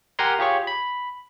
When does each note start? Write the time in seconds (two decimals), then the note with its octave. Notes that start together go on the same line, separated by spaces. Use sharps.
0.19 G4 A#4 F#5 G#5 A#5 C6
0.39 F4 G4 G#4 C#5 C#6
0.67 B5